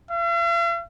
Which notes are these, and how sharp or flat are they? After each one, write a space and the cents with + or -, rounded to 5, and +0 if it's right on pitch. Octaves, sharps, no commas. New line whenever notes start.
F5 -45